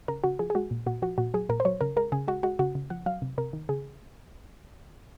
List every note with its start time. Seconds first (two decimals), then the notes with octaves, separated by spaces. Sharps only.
0.08 C#3 A#4
0.24 C#3 F#4
0.39 F3 G#4
0.50 G#4
0.55 G#3 F#4
0.71 A#2
0.86 A#2 F#4
1.02 F3 F#4
1.18 A#2 F#4
1.34 F#3 G#4
1.49 A#2 A#4
1.60 C5
1.65 F#3 C#5
1.81 C#3 A#4
1.97 G#3 A#4
2.12 C#3 G#4
2.28 G#3 F#4
2.43 G#3 F#4
2.59 C#3 F#4
2.75 C#3
2.90 F3 F#5
3.06 F#3 F5
3.22 C3
3.38 C3 A#4
3.53 D#3
3.69 C#3 G#4